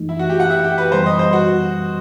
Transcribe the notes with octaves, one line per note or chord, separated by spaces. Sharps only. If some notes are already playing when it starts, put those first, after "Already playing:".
Already playing: F#2 E3 A3 D#4
E4
F#4
G4
F#5
E5
G4
B4
F#2 E3 G3 B3 C5
D#5
C5
F#4